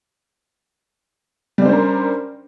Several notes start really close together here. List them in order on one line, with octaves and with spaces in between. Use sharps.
G3 D4 C5 C#4 A#4